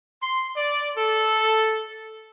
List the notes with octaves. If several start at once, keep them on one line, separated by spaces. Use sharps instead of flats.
C6
D5
A4